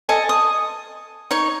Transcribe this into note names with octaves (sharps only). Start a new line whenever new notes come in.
A4 D#5 G#5
D#6
D#4 C#5